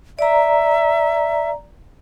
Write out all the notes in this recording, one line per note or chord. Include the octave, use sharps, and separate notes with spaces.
D5 E5 A#5